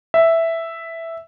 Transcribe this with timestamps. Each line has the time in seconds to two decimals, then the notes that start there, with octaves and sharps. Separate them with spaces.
0.14 E5